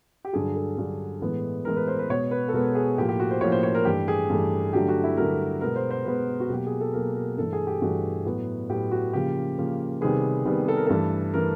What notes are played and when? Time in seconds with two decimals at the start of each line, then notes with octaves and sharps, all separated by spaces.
0.25 G4
0.33 G2 D3 F#3 G#4
0.56 A4
0.77 G2 D3 F#3
1.22 A2 E3 G#3 B3
1.65 A2 E3 G#3 B3 A#4
1.76 B4
1.87 C5
1.99 B4
2.10 B2 G#3 B3 C#5
2.31 B4
2.49 A4
2.53 B2 G#3 B3 A#4
2.75 G#4
2.97 A2 F3 A#3 G4
3.09 G4
3.20 F#4
3.31 C5
3.41 A2 F3 A#3 C#5
3.52 C5
3.63 C#5
3.75 A#4
3.85 G2 E3 A3 G4
4.08 G#4
4.30 G2 E3 A3
4.73 G2 D3 F#3 A3 G4
4.89 F#4
5.04 E4
5.17 G2 D3 F#3 A3 A#4
5.61 B2 G#3 B3 A#4
5.76 C5
5.91 C5
6.05 B2 G#3 B3 B4
6.40 F#4
6.50 B2 F#3 A#3 G4
6.66 G#4
6.81 A4
6.93 B2 F#3 A#3 A#4
7.16 A#4
7.37 G2 E3 A3 A4
7.53 G#4
7.67 G4
7.81 G2 E3 A3 F#4
8.25 A2 F#3 B3
8.69 A2 F#3 B3 G4
8.91 F#4
9.13 C#3 F3 A#3 G4
9.58 C#3 F3 A#3
10.01 C3 D#3 G3 B3 G#4
10.45 C3 D#3 G3 B3
10.68 A4
10.77 A#4
10.87 G2 E3 A3 A4
11.34 E3 A3 A#4